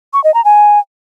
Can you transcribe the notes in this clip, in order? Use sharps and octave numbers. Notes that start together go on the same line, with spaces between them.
C#6
D#5
A#5
G#5